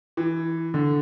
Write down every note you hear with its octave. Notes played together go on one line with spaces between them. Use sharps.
E3
D3